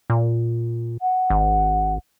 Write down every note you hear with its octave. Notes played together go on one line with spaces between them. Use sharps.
A#2
F#5
G#1